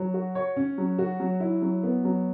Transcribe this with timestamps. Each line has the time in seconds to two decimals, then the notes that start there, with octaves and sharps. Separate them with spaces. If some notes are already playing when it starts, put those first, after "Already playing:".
Already playing: F#3
0.14 F#4
0.35 C#5
0.57 C#4
0.78 F#3
0.99 F#4
1.20 F#3
1.40 E4
1.62 F#3
1.83 B3
2.05 F#3